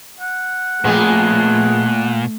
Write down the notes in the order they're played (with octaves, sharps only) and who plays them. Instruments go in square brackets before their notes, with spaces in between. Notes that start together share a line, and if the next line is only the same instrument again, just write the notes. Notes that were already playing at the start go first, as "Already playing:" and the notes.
[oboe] F#5
[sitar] F2 G#3 B3 [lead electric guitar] A#2 [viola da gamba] A3